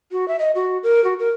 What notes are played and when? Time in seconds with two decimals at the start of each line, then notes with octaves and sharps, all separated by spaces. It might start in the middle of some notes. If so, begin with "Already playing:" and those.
0.12 F#4
0.28 E5
0.39 D#5
0.55 F#4
0.83 A#4
1.04 F#4
1.19 A#4